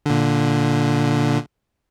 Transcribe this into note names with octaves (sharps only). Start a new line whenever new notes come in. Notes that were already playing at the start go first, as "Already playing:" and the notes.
A#2 D3